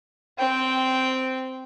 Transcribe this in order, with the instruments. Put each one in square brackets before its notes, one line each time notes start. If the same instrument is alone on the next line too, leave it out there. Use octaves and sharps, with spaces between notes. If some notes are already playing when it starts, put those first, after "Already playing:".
[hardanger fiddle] C4 G5